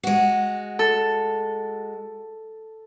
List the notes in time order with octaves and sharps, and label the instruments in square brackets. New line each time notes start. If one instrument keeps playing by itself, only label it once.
[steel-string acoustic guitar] G#3 F#4
[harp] A4